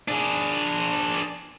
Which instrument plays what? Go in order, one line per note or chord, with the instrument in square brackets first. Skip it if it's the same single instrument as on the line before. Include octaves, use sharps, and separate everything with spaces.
[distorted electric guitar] D4 G#4